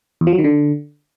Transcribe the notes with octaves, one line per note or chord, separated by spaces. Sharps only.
E2
F3
F#3
D#3
D3